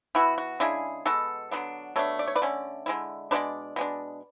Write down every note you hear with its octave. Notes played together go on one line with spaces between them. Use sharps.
E3 B3 E4 F#4
F#4
C#3 G#3 D4 E4 G#4
B2 G#3 B3 F#4 A4
D3 F#3 B3 D4
B2 A3 D4 A4 C#5
D5
C#5
B4 D5
D3 A3 C#4
D3 G#3 B3 E4
B2 G#3 B3 D4 B4 D5
B2 G#3 D4